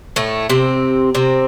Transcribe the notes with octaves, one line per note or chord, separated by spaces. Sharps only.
A2 A3
C3 C4
C3 C4